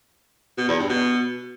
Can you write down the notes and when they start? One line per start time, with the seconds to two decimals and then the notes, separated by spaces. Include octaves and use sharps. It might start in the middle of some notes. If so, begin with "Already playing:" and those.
0.58 B2
0.68 E2
0.79 G2
0.89 B2